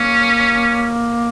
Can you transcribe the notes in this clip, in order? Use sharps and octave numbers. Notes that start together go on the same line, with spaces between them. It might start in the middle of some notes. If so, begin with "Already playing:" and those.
Already playing: A#3 C#4